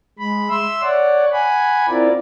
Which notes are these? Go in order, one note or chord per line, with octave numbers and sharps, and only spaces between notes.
G#3 B5
E5 C6 E6
C#5 D5 F#5
F#5 G#5 B5
C4 E4 F4 A#4 D5